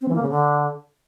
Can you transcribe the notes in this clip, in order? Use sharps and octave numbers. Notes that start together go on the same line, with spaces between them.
C4
E3
A#3
C#3
D3